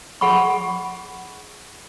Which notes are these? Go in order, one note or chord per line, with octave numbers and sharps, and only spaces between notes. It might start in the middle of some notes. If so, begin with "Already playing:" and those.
G#4 F#5 B5 C#6